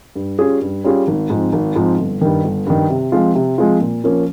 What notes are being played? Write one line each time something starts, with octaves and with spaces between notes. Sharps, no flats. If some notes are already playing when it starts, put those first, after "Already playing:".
G2
G3 C#4 F4 G#4
G2
G3 C#4 F4 G#4
G#1
G#2 F3 C4
G#1
G#2 F3 C4
G1
G2 D#3
G1
G2 D#3
C3
F3 G#3 C4 F4
C3
F3 G#3 C4 F4
A#2
F3 A#3 C#4